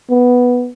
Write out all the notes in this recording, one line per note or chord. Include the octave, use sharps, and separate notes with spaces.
B3